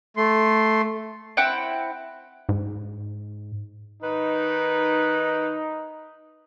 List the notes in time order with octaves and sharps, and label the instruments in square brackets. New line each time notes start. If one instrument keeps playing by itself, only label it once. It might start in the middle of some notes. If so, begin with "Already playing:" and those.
[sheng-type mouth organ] A3 C6
[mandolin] C4 E4 F#5 G5
[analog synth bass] G#2
[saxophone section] D#3 B4 [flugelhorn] D#4